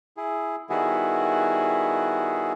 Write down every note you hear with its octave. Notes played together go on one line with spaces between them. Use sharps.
E4 G#4
D#3 G3 B3 E4 F#4 G#4